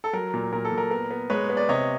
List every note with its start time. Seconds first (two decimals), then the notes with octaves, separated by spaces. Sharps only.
0.04 A4
0.13 F#3 A#4
0.34 A#2
0.53 A#2 A#4
0.65 A4
0.72 A#2
0.78 A#4
0.91 B3 A#4
1.11 B3
1.30 G#3 B4 C#5
1.50 B3
1.57 D5
1.69 C3 C#5 D#5